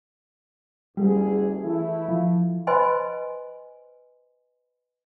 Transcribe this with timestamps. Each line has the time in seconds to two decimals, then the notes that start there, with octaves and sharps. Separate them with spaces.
0.97 F#1 D2 G3 G#4
1.63 E3 A3 E4
2.09 F3
2.67 B4 C5 D#5 G#5 B5 C6